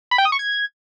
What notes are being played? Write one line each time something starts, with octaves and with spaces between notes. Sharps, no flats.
B5
G5
D#6
C#6
G#6